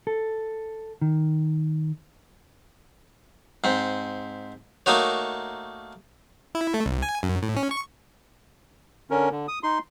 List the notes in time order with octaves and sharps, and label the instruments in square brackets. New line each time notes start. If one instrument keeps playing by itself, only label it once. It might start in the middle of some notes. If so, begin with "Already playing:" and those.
[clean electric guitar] A4
D#3
[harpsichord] G#2 C4
A3 A#3 D#4 F#4 C#5
[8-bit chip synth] E4
A3
C2
G#5
F#2
A2
C#4
C#6
[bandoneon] D3 C#4 A#4
D3
D#6
D#4 C6